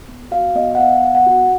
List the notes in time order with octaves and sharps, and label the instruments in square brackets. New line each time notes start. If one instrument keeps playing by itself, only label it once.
[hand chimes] B3
F#4 F5
B3 D#5
F#5
B3 F5
B3
F#5
F#4